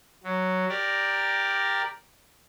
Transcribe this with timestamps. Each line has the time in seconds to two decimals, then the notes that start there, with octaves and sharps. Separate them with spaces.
0.23 F#3
0.69 G4 A#4 D5